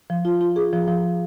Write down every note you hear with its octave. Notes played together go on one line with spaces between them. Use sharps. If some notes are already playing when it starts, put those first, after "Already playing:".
F3
F4
F4
G#4
F3
F3